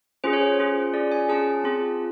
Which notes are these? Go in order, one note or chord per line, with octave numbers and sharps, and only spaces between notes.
C#4 F4 G#4 C5
C#5
C5
C#4 F4 G#4
C#4 F4 G#4 D5
G#5
C#4 F4 G#4 A5
C4 F4 G#4